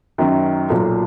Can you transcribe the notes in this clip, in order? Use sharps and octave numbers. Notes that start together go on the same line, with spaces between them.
F#2 D#3 F#3
B1 A#2 F#3